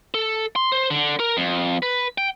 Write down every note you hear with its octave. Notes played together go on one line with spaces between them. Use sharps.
A4
C6
C5
D3
A#4
F2
B4
G5